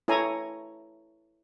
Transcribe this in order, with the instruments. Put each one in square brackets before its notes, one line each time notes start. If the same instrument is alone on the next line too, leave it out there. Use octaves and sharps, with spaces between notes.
[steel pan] E4 A4 C#5 G#5 A#5